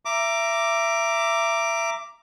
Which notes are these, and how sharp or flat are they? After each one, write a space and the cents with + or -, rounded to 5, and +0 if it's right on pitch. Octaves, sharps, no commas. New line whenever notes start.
E5 +25 A#5 +0 D6 +0